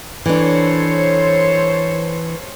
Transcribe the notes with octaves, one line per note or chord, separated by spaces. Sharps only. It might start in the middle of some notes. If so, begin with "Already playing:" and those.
E3 D4 A4 C5 C#5